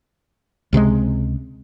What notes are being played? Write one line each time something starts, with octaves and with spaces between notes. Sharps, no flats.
C#2 C3 E3 G#3